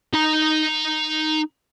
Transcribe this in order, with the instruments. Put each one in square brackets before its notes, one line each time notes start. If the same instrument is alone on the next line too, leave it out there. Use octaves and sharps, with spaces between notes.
[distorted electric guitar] D#4 A#5